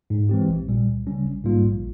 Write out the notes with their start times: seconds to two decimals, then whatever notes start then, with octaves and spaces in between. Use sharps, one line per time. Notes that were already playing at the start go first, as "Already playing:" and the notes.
0.10 G#2
0.29 E3 G#3 C4 G4
0.48 A#1
0.68 A#2 G3
0.87 C#2
1.07 C#3 G3 C#4
1.25 A#1
1.44 G#2 G3 A#3 F4
1.64 A#1